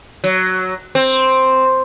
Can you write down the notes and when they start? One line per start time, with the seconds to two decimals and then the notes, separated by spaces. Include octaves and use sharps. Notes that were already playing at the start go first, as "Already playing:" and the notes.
0.24 F#3
0.95 C4